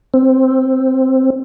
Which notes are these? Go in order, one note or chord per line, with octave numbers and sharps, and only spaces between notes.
C4